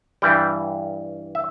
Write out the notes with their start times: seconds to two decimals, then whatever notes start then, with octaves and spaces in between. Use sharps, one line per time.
0.22 G2 E3 G3 G5
1.35 E5